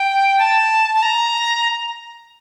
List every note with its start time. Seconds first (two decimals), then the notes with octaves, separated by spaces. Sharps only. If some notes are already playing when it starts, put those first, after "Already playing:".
Already playing: G5
0.39 A5
0.95 A5
1.03 A#5